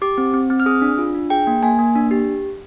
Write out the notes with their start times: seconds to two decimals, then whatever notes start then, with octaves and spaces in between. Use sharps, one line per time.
0.02 G4 D6
0.18 C4
0.34 C4
0.50 C4
0.60 F6
0.66 G#4 D#6
0.82 D4
0.98 F4
1.14 D4
1.30 G#4 G5
1.47 A#3
1.63 A#3 G#5
1.79 A#3
1.96 D4
2.11 G4